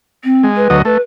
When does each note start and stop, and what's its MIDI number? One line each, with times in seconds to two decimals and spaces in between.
0.24 0.46 60
0.43 0.68 56
0.56 0.77 71
0.70 0.82 38
0.70 0.82 54
0.70 0.82 75
0.85 0.98 57
0.85 1.01 71